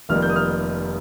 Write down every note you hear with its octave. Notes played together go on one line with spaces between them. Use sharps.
F1 F2 D#3 G3 A#3 F6
G6
D#6
F6